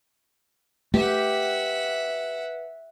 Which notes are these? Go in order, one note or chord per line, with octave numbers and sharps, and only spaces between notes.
A3 G4 B4 E5 F#5